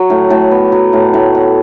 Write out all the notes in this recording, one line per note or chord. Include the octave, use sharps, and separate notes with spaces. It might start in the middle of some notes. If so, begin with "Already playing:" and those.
Already playing: F#3
A2
A2
B3
F#3
A2
A2
B3